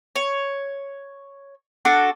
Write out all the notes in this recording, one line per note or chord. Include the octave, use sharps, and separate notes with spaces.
C#5
D4 F#4 A4